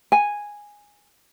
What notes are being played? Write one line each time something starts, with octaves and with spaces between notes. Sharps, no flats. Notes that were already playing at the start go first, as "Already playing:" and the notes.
G#5